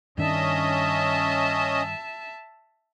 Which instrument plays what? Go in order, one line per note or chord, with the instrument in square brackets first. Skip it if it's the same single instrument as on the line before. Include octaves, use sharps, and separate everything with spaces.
[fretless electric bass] G2 D#3 D4 [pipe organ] C#4 D#5 [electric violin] E5 A5